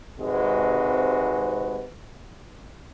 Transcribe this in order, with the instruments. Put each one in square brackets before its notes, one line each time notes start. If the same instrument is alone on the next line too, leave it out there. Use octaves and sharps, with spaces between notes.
[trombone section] G#1 G#2 C3 G#3 F#4 B4